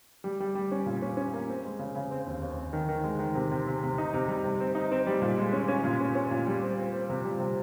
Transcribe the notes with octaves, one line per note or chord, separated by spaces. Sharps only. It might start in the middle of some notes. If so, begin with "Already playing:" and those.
G3
G3
G3
C#4
A#2
C#4
C#4
A#3
C4
G#3
C#3
C#3
C4
D#2
D#2
C4
D#3
D#3
G#3
D#3
C3
C3
C3
C3
D#4
C3
G3
C3
C4
D#4
C4
G3
A#2
G#3
C#4
C#4
A#2
C#4
C#4
A#2
G3
C4
C4
C4
C3
G3
C3